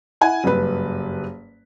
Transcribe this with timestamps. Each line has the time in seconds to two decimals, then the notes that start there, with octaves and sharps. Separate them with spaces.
0.21 E4 F#5 G#5
0.44 F#1 G2 B4